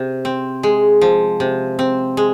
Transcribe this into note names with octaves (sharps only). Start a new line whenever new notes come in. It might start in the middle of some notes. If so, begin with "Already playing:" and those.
Already playing: C3
C4
G#3
F3
C3
C4
G#3